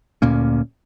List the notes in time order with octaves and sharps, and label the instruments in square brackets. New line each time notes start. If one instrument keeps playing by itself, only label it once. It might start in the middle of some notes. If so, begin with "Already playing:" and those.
[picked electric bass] D2 A#2 A#3 C#4